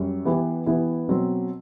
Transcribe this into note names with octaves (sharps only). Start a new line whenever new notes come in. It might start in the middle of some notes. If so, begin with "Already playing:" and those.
Already playing: F#2 G3
E3 B3 E4 G4
E3 B3 E4 G4
B2 F#3 C4